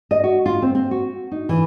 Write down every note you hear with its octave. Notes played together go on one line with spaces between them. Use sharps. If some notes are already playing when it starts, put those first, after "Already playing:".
D#5
F#4
F4
C4
C4
F#4
D#4
E3